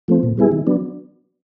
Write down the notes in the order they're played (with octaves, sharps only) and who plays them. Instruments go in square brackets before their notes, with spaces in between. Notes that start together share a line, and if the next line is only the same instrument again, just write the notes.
[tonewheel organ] F3 A3 C4
A#2
G3 B3 E4 G#4
D#3
F#3 B3 D4